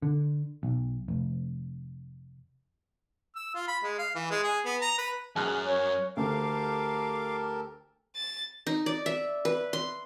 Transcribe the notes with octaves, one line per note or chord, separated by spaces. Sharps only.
D3
B1
F1
E6
F4
B5
G#3
F5
E3
G#3
G#4
B3
A#5
B4
F#2 G#4 G#5 F6 F#6
C#5
D2 G4 A4 A#4 F5 D6
A6
D#4
D5
E5
B4
C6